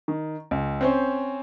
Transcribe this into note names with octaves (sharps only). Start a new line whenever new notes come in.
D#3
C#2
C4 C#4 C5